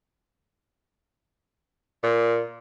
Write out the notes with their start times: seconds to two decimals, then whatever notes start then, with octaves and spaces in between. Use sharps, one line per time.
2.03 A#2